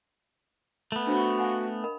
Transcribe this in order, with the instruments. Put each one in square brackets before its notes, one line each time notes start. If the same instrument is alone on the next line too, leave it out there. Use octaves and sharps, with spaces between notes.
[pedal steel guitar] A3 B3
[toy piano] D4 C5 B5 [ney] F#4
[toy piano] F5 F#5 G#5
A#4 D#5 B5